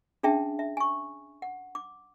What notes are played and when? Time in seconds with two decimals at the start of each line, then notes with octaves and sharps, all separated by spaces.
0.23 C#4 D4 G#4 E5 G5 A5
0.59 E5
0.77 G#5 C#6
1.42 F#5
1.75 D6